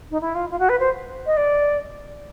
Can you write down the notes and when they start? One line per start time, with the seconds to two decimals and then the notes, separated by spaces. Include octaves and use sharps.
0.10 D#4
0.21 E4
0.34 F4
0.50 F4
0.59 F#4
0.69 B4
0.79 C5
1.26 D#5
1.36 D5